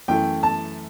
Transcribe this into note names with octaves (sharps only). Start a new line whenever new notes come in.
F#2 E3 A3 G5
A5